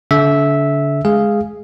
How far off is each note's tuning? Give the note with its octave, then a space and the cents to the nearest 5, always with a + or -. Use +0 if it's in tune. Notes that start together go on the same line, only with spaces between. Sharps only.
D3 -35 E5 -10
G#3 +10 G#4 +0 F5 -5